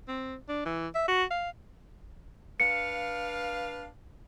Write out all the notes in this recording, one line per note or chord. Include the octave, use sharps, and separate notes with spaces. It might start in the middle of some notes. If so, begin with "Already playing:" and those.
C4
D4
E3
E5
F#4
F5
D4 B4 F5 C#7